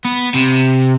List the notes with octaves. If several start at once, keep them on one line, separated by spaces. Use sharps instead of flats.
B3
C3